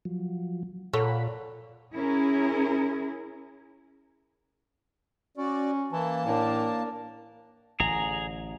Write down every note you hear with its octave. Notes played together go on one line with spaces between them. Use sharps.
F3 F#3
A#2 A4 C#5 F#5 B5
C#4 E4 G#4 A#4
C#4 F#4 D5
E3 A#3 A5
A2 D4 A#4
A1 D3 G#4 A#5